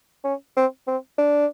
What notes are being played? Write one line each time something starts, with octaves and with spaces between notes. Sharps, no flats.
C#4
C4
C4
D4